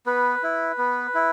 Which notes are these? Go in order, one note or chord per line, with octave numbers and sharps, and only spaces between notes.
B3 B4
E4
B3
E4